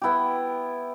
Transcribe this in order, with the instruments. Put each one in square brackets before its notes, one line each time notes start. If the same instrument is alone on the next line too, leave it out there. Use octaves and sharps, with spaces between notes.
[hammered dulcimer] B3 E4 G4